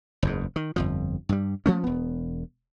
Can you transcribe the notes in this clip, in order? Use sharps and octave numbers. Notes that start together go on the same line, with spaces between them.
F#1 E2 G#2
D#3
G1 F2 F3
G2 G3
F3 A3 C#4
E1 B3